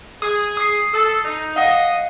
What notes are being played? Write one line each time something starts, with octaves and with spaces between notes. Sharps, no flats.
G#4 D#6
D#6 C7
A4
D#4
D#5 F5 F#5